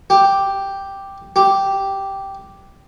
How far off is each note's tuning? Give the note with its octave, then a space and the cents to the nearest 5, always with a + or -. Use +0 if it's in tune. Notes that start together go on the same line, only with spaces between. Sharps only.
G4 +0
G4 -5